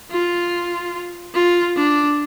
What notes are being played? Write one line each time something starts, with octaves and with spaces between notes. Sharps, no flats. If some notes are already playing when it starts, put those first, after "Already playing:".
F4
F4
D4